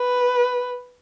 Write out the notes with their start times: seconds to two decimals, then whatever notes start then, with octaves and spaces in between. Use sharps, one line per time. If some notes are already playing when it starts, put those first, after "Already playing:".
Already playing: B4